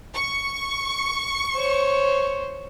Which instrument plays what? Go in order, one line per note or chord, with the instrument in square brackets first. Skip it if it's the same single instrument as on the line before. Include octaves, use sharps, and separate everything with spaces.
[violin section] C#6
[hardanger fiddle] C5 C#5